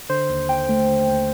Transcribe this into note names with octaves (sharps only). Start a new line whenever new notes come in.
D3 C5
D#2
D#2 G5
A3
D3
D#2